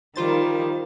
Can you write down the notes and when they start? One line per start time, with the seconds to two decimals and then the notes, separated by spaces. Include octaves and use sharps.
0.16 D#3 G3 A#3 F4 C5 A6